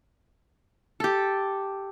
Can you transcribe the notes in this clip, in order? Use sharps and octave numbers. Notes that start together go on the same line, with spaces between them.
G4 A4